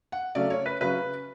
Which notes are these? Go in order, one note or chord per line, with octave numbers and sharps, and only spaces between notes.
F#5
C#3 F#3 A3 C#4 D5
C#5
B4
C#3 F#3 C#4 B4